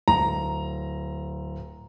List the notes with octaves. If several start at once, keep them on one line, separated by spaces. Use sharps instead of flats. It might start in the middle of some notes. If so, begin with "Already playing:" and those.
D1 A#5